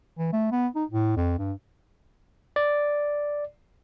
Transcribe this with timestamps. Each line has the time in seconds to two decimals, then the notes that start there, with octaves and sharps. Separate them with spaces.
0.18 E3
0.33 A3
0.52 B3
0.75 D#4
0.90 A2
1.16 F2
1.38 G2
2.56 D5